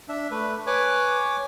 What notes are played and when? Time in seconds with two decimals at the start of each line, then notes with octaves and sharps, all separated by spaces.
0.09 D4 E5
0.31 A3 B4
0.67 B4 C#5 G#5 D6